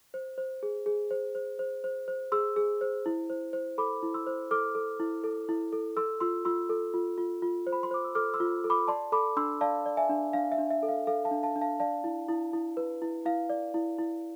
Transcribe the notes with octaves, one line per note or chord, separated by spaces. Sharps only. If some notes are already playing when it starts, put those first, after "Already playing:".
C5
C5
G#4
G#4
C5
C5
C5
C5
C5
G#4 C6 E6
G#4
C5
E4
C5
C5
A4 B5 D6
E4
C6 E6
C5
A4 D6 F6
A4
E4
A4
E4
A4
A4 C6 E6
F4 C6 E6
F4 C6 E6
A4
F4
F4
F4
C5
B5
C6
C5 D6
E6
A4 D6 F6
C6 E6
F4
A4
B5 D6
D5 A5 C6
A4 B5 D6
D4 C6 E6
D5 F5 A5
D5
E5 G#5
D4
D4 F5
E5
D4
E5
A4
F5
A4 F5
F5 A5
D4
F5 A5
D4
F5 A5
D5 F5 A5
E4
E4
E4
B4
E4
E4 F5
D5
E4
E4